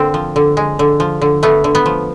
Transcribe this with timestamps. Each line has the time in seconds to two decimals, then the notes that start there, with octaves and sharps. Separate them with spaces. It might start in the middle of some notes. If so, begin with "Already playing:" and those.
Already playing: D3 A#3 C4
0.14 F3
0.36 D3
0.57 G#3
0.79 D3
1.00 F3
1.22 D3
1.43 A3 B3
1.64 D3
1.75 B3
1.86 F3